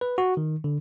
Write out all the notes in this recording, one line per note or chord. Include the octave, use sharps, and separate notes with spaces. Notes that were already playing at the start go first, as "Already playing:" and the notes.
B4
F#4
D#3
D3